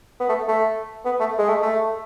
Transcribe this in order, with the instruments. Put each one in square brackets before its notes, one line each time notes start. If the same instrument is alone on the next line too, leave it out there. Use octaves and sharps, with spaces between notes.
[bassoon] B3
A3
A3
B3
A3
G#3
A3
A3